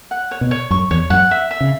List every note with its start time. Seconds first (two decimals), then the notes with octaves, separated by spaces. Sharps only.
0.11 F#5
0.31 C#5
0.41 B2
0.51 C#5
0.70 F#2 C#6
0.91 E2 C#5
1.10 F#2 F#5
1.31 E5
1.51 E5
1.61 C#3